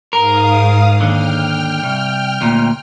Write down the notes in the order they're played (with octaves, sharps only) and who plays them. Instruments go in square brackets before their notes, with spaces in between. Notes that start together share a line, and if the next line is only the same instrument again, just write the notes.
[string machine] G#2 F5 D#6 [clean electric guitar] A#4
[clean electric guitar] D#2 D3 [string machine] G5 F6
[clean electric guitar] C2
D2 A#2